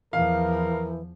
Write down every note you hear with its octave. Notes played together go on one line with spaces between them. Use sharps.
E2 E3 F3 A#4 F5